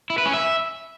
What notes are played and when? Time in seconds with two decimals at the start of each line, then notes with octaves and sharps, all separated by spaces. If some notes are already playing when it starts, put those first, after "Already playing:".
0.10 E4
0.18 B4
0.26 C#4
0.34 E5